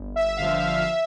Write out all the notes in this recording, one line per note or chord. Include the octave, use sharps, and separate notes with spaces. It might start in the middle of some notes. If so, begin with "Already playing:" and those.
Already playing: G1
E5
G2 D3 F3 F5
F5
E5